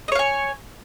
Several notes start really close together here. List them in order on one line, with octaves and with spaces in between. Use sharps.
D#5 C#5 F5 G#5